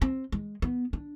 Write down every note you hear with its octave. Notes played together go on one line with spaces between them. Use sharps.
C4
G#3
B3
D4